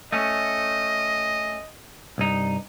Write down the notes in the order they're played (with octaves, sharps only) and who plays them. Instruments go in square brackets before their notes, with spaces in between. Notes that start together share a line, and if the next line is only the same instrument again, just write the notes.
[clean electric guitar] A3 C#4 [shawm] D#5
[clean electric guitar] C2 G2 D#4